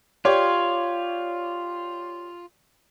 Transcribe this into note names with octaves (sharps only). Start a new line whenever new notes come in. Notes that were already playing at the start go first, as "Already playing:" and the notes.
F4 G4 C#5 D5